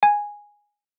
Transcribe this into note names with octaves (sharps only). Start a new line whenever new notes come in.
G#5